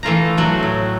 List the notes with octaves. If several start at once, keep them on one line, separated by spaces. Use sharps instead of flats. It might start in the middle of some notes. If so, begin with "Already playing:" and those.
E3 A3 F4 A#5
F#3 A3 F#4
A2